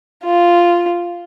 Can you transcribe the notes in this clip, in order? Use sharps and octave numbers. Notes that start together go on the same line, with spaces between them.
F4